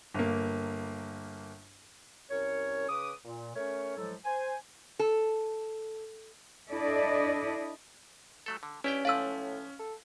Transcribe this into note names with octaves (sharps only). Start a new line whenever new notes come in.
G1 A#3
C2 C#4 A#4 C#5
C#3 B4 D6 D#6
A#2
A3 C#4 A#4 C#5
A2 F3 F#3 G#3 A4
C5 G#5
A4
D4 E4 A4 D5 D#5
F#3 A3 A4
D3
G2 C#4 E4 G4 G5
A2 F3 B4 D5 F5 E6
A4